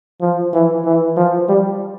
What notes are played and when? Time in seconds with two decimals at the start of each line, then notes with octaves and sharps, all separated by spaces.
0.21 F3
0.53 E3
0.85 E3
1.17 F3
1.49 G3